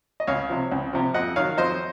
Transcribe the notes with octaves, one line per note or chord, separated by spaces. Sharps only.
D#5
C#2 C#5 F5
C3 F3
C#2
C3 F3
F2 D#5 F#5
D#3 F#3 C#5 F5
F2 C5 D#5